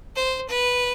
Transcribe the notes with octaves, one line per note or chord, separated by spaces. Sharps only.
C5
B4